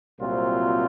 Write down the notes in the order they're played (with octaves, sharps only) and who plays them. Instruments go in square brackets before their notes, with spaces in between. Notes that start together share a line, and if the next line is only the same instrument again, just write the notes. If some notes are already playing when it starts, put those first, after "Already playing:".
[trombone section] C2 A#2 F#3 C4 F4